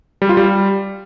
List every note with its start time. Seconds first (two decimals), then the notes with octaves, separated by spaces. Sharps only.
0.22 G3
0.29 F4
0.37 G3